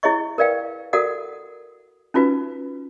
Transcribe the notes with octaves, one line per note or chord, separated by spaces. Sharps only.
E4 G#4 C#5 D#5 C#6
A#4 B4 D5 F5 G5
F#4 A4 A#4 D5 F#5 D#6
C#4 D#4 F4 F#4 B4